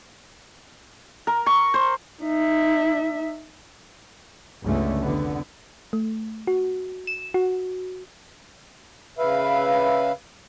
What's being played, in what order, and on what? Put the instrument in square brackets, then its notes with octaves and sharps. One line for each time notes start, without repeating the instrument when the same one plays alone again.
[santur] A#4
C#6
C5
[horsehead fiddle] D#4 E5
[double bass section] G1 C#2 D3 G#3 A3 C#4
F1 D3 B3
[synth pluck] A3
F#4
E7
F#4
[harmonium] C#3 B4 E5 F5